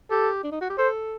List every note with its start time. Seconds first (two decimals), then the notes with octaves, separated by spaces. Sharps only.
0.10 G4 A4
0.43 D4
0.52 D#4
0.61 F#4
0.69 G4
0.78 A4 C5